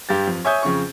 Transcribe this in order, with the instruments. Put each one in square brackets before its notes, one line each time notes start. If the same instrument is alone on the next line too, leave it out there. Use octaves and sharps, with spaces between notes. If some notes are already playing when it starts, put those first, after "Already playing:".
[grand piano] G2 G4 A6
F2
C#5 E5 G#5 C#6 D#6 G6
F2 C#3 C#6